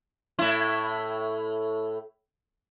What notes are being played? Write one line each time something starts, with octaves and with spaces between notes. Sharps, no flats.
A2 E4